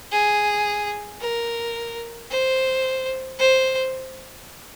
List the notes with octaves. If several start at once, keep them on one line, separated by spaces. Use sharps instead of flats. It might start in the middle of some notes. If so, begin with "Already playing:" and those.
G#4
A#4
C5
C5